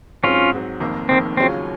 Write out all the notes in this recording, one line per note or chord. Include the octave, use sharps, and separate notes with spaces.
G#2 F#3 C4 C#4 F4
G#2 F#3 C4
F1 F2 D#3 A#3
F1 F2 D#3 A#3 C4
D#2 C#3 F#3 C4 C#4 F4